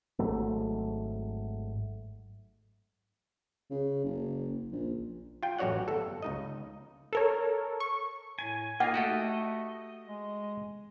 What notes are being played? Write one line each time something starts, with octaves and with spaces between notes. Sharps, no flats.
G#1 G#2 F#3 A3
C#3
F#1
A#1
F4 G5
A1 F#2 F#4 C#5 D5 F#5
G1 A4
C#2 D#4 D#5
A4 A#4 C#5
C#6
A2 G#5
A#3 D#4 F4 D#5 F#5
A3 F#4 G4 A4
G#3